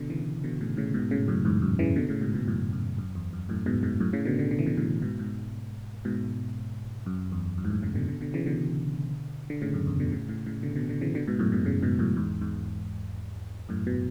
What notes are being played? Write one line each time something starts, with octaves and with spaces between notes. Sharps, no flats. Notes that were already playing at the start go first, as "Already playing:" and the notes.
Already playing: B2 D3
C#3 E3
B2 D3
A2 C#3
A2 C#3
G#2 B2
A2 C#3
F#2 A2
E2 G#2
F#2
C#3 E3
B2 D3
A2 C#3
G#2 B2
G#2 B2
F#2 A2
F#2
F#2
E2
F#2
F#2 A2
G#2 B2
G#2 B2
F#2 A2
A2 C#3
B2 D3
B2 D3
D3
E3
B2 D3
A2 C#3
G#2 B2
G#2 B2
G#2 B2
F#2
E2
F#2
G#2
F#2 A2
A2 C#3
B2 D3
B2 D3
B2 D3
C#3 E3
B2 D3
D3
A2 C#3
F#2
E2
B2 D3
A2 C#3
A2 C#3
A2 C#3
B2 D3
B2 D3
B2 D3
C#3 E3
B2 D3
G#2 B2
F#2 A2
G#2 B2
A2 C#3
G#2 B2
F#2 A2
E2 G#2
E2 G#2
F#2 A2
B2